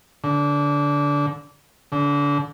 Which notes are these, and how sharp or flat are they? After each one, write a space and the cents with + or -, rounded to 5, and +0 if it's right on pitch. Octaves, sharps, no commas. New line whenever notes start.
D3 -20
D3 -30